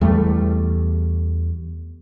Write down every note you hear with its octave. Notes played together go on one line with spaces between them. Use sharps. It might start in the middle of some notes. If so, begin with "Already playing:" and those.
E2 G3 A3